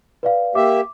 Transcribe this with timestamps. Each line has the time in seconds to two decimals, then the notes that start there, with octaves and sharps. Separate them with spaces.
0.23 B4 D5 F5
0.55 A#3 G4 E5 D6